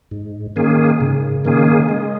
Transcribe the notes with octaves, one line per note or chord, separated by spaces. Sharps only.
G#2
D#3 A#3 C#4 G#4
G#2 C#3
D#3 A#3 C#4 G#4
G#3